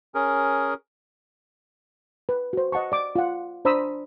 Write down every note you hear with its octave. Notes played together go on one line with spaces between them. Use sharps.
C#4 G#4 A#4
B4
F#4 C5
D#5 F#5 A5 C#6
D5 D6
F4 F#5
D4 C5 A#5 B5 D#6 E6